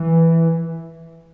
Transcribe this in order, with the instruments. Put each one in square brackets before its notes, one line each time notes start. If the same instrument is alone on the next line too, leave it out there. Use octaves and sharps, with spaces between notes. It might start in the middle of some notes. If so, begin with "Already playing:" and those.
Already playing: [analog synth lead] E3